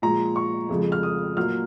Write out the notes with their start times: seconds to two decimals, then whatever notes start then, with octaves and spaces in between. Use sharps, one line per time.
0.02 A#2 F3 G#3 A#5
0.36 C#6
0.69 F2 C#3 F3 G#3
0.92 F6
1.03 D#6
1.36 A#2 F#3 A#3 F6